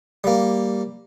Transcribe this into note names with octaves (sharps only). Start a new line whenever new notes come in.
G3 A#3